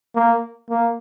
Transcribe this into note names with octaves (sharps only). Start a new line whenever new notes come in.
A#3
A#3